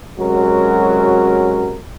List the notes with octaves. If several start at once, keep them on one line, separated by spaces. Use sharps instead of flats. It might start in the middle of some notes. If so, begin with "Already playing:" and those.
C3 F#3 G#3 C#4 F#4 A#4